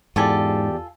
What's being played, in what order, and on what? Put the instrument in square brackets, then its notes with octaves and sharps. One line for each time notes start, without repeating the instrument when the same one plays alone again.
[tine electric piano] E2 G4 D5 [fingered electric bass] G#2 [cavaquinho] F4 A4 G#5